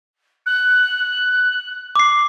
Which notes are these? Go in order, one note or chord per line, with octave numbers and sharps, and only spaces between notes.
F#6
D6 C7